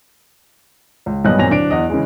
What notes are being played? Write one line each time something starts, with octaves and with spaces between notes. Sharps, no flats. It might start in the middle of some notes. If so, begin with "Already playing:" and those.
C#2
B1 G2 A#2 B3 D#5 F#6
F#2 A#2 C4 G#5 A#6 F7
D1 D4 D7
E2 D#5
C#3 E3 G#3